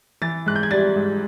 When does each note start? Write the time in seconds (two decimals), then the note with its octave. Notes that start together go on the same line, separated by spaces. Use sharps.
0.22 E3 A6
0.46 G#2 F#6
0.55 G6
0.63 G#6
0.71 G3 A6
0.96 G#2